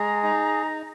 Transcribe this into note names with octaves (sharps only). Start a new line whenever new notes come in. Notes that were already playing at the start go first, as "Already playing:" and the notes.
Already playing: G#3 G#4 A#5
D#4